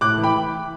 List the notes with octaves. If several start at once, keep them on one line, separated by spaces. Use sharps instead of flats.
A2 D6 F#6
E3
G5 B5